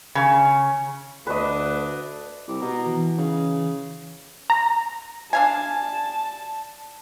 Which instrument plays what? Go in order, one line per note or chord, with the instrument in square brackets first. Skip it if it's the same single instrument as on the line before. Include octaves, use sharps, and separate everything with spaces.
[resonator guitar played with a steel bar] C#3
[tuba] D2 [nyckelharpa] D4 [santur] B4 D#5
[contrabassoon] C2 [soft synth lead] D6
[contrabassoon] B2 [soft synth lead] A#5
[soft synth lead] E3
[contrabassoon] C#3
[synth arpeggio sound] A#5
[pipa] D4 F5 G#5 [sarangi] A5